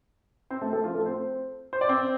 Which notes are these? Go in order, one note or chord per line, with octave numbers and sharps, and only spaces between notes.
C4 C5
A3 A4
A3 A4
F3 F4
A3 A4
C4 C5
C5
D5
C4 C5